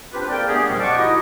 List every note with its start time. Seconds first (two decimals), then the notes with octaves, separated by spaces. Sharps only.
0.13 C4 D4 F4 G4 B4
0.30 A#3 G#4 A#4 D5 G5
0.48 G3 A3 B3 D4 G4 G#4
0.68 D#2 A#2 F3 G3 G#3 C#4
0.80 D#5 F#5 G5 A5 C#6 D6
0.96 D#4 E4 F#4 G4 D#5